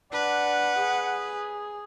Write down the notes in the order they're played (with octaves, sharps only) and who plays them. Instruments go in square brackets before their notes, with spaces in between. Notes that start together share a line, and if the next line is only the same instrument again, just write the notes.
[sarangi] D4 [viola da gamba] B4 [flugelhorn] F#5
[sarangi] G#4